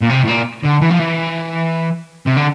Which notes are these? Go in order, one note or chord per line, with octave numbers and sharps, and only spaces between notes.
A#2
C3
A2
A#2
D3
E3
F3
E3
C3
D3